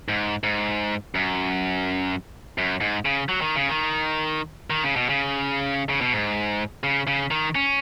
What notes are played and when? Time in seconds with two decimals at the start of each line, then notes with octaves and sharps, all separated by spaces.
0.08 G#2
0.43 G#2
1.15 F#2
2.58 F#2
2.81 G#2
3.05 C#3
3.29 F#3
3.41 D#3
3.56 C#3
3.69 D#3
4.70 D#3
4.84 C#3
4.96 B2
5.09 C#3
5.89 C#3
6.01 B2
6.12 G#2
6.84 C#3
7.07 C#3
7.31 D#3
7.55 C#4